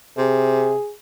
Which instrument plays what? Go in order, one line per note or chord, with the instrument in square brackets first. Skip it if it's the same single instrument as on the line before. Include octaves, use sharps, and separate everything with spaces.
[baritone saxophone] C3 [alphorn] G#4